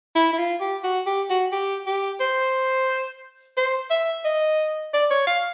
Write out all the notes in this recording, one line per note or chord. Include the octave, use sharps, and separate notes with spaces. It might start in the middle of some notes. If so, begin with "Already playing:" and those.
E4
E4
F4
G4
F#4
G4
F#4
G4
G4
C5
C5
E5
D#5
D5
C#5
F5